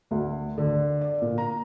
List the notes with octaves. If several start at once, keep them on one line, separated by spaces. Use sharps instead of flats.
D2
D3
D5
A#2
A#5